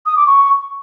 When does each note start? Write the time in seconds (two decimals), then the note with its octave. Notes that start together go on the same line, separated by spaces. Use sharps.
0.06 D#6
0.16 D6
0.26 C#6